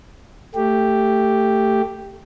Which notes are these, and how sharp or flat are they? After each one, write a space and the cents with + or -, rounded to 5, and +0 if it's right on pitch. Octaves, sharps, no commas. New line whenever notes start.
A3 +15 G4 +0